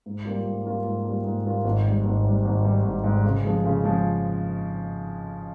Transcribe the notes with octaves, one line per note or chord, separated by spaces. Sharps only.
G#2
G3 A#3 F4
G#2
G3 A#3 F4
G#2
G3 A#3 F4
G#2
G3 A#3 F4
G#1
G#2 G3
G#1
G#2 G3
G#1
G#2 G3
G#1
G#2 G3
C#3
F3 G#3
C#3
F3 G#3